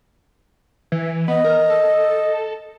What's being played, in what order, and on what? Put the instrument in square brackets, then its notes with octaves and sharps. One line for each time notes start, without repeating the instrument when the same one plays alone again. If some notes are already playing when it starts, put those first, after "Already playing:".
[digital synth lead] E3
[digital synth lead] B3 [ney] D#5
[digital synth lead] A#4
A4